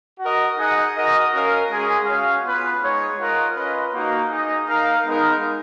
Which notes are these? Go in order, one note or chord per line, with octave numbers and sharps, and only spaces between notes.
F#4 A#4 D#5
D#4 G#4 D#5 F#5
F#4 A#4 D#5
C#4 F#4 A#4 F5
G#3 C#4 G#4
C#4 F#4 C#5 F5
B3 F4 B4
G#3 D#4 G#4 C#5
F4 A#4 D#5 F#5
C#4 F4 B4 D#5
A#3 D#4 F#4
D#4 G#4 D#5
D#4 A#4 F5
G#3 B3 D#4 A#4